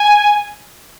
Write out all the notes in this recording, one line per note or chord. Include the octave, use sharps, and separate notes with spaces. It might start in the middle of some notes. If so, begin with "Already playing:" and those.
Already playing: G#5